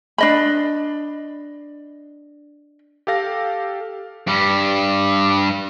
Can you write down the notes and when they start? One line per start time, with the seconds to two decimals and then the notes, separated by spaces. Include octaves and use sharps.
0.18 D4 D#5 B5
3.07 G4 A4 F5 A#6
4.27 G2 G3